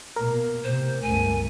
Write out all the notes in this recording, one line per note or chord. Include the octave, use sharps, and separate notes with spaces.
B2 A#3 A#4
A2 C3 C5
G1 C#2 A3 G#5